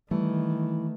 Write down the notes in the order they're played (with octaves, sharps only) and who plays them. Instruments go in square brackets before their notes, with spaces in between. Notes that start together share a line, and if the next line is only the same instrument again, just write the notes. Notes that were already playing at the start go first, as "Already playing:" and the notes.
[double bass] D#3 [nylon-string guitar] E3 [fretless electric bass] G3 [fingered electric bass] A3